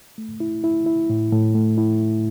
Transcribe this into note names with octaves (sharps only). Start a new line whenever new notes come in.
A3
E4
E4
E4
A2
A2
A3
E4
A2